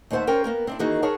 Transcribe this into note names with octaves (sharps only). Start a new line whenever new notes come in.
D#2 A3 B3 C5 E5 F#5
C#4 A#4 C5 G5
A#3 B3 A#4
C4 D4 E4
D#3 E3 A#3 D#4 F#4 G#4
G#4 A#4 C#5 F#5 A5